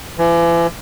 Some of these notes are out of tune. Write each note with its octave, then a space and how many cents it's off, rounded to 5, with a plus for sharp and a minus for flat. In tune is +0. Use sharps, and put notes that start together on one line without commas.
E3 +40